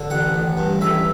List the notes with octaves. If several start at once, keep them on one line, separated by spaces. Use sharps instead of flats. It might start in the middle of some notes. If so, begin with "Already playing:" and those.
Already playing: D3
A1 F#5
A1
G2
A1 E5